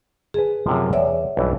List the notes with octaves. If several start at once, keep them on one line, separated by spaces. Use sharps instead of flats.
G#4 B4 G#5 A5
F#2 C3 F3
E2 C#5 D5 E5
B1 G2 E3